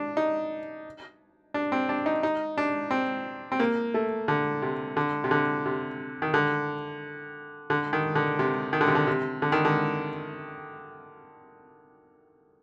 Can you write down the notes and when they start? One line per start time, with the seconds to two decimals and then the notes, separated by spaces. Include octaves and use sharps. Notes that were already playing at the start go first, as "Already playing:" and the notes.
Already playing: D4
0.17 D#4
1.54 D4
1.72 C4
1.89 D4
2.06 D#4
2.23 D#4
2.58 D4
2.91 C4
3.52 C4
3.60 A#3
3.94 A3
4.28 D3
4.62 C3
4.97 D3
5.24 C3
5.31 D3
5.66 C3
6.22 D#3
6.34 D3
7.70 D3
7.93 D#3
8.15 D3
8.39 C3
8.73 D#3
8.81 D3
8.88 C3
8.95 D3
9.07 C3
9.42 D3
9.52 D#3
9.65 D3